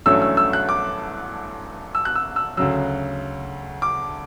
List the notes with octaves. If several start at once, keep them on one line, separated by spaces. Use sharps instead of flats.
A1 G2 F#3 A3 C#4 E6
E6
E6
F#6
D6
E6
F#6
E6
E6
D2 C#3 F#3 E6
D6